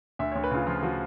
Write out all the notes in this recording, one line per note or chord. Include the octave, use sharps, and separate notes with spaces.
D2 E5
D2 C#5
B4
C#3 F4
F3 F4
F3 F#4